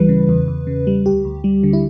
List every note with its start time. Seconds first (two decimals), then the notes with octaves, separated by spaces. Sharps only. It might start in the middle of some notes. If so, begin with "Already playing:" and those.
Already playing: D2 E3 G3 B4
0.09 C#3
0.29 E2
0.48 E2
0.67 C#3
0.87 G3
1.06 D2 G4
1.25 D2
1.44 G3
1.63 D3
1.73 E4